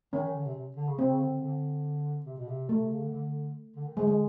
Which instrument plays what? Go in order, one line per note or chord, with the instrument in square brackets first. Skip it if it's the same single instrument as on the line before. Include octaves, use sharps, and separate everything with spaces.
[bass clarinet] D#3 [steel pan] C#4
[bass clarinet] D#3
D3
C3
C3
D3
C#3
[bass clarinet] C3 [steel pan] C4
[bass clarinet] C#3
D3
D3
D3
C3
B2
C3
[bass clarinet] B2 [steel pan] A3
[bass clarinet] C3
C#3
D3
D3
D3
D#3
[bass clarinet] D3 [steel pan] G#3
[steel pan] G#3